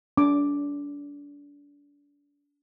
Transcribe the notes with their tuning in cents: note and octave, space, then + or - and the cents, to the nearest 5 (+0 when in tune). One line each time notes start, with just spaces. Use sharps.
D4 -35 D6 +0